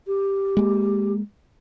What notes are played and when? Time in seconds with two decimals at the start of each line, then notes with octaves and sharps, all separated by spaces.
0.06 G4
0.57 G#3 A#3